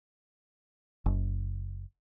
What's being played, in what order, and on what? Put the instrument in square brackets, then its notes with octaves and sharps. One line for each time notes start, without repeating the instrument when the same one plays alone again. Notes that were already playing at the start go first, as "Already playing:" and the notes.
[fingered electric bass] F#1